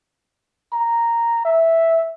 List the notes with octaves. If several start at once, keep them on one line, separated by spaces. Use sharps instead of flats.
A#5
E5